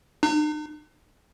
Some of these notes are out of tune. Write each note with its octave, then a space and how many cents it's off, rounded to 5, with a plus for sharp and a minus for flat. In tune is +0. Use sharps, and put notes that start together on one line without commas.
D#4 -45